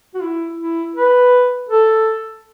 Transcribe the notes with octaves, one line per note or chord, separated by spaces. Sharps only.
F#4
E4
E4
B4
A4